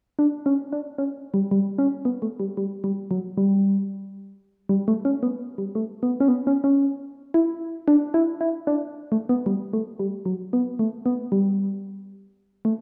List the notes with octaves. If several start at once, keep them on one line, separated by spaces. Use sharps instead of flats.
D4
C#4
D4
C#4
G3
G3
C#4
B3
A3
G3
G3
G3
F#3
G3
G3
A3
C#4
B3
G3
A3
B3
C#4
B3
C#4
C#4
E4
D4
E4
E4
D4
A3
B3
G3
A3
G3
F#3
B3
A3
B3
G3
A3